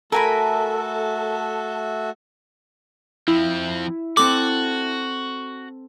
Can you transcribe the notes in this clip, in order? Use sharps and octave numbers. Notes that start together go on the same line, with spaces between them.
A3 F#4 A4 A#4 E5 G#5 B5
F3 C4 E4
C4 F#4 A4 D6